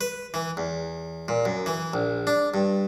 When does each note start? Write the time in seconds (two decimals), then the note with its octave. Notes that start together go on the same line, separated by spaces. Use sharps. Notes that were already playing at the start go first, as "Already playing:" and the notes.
0.01 B4
0.34 E3
0.57 E2
1.28 A#2
1.45 F#2
1.66 E3
1.94 A#1
2.27 D4
2.54 G2